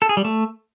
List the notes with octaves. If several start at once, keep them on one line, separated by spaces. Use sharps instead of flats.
A4
G#4
G3
A3